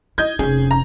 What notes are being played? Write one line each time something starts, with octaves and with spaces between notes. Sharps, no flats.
E4 D#5 G6 G#6
F1 C#4 G#4
A#5